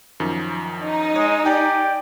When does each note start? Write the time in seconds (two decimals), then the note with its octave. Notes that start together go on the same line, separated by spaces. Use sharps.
0.20 F#2 D#3 F3
0.86 D#4
1.16 G#3 C#5 D#5
1.45 G4 D5 G5 G#5